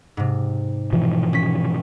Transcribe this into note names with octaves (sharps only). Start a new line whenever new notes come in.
G#2 C3
B2 E3 F3
C#4 B6